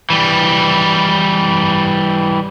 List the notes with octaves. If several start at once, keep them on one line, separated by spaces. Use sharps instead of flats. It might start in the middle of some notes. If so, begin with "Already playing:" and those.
E3 G3